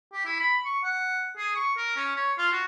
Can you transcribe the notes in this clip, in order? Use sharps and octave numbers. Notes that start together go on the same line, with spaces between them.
G4
E4
B5
C#6
F#5
G#4
C#6
A#4
C#4
C#5
F4
F#4